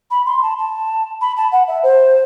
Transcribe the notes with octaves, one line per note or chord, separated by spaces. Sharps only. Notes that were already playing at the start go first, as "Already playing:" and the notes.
B5
C6
A5
A5
B5
A5
F#5
E5
C5